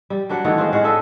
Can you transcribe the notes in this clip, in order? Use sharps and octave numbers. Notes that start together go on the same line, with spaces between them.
G3
F#3 D4 B4 F#5
D#3 E3 A3 B3
G#3 C4 F4
A2 G#3 F5 F#5
D4 A4 D#5 E5